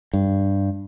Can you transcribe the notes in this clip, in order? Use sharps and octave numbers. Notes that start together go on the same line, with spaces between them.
G2